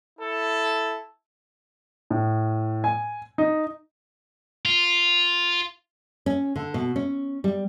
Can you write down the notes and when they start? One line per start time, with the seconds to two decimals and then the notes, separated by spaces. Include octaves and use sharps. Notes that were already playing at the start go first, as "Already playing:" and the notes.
0.20 E4 A4
2.10 A2
2.84 G#5
3.38 D#4
4.65 F4
6.26 C#4
6.56 D3
6.74 B2
6.96 C#4
7.44 G3